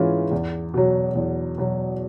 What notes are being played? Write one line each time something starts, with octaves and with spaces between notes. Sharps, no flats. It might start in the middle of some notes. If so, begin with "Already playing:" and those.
Already playing: G#2 E3 G#3 C#4 F4
E2
B2 F#3
E2
B2 F#3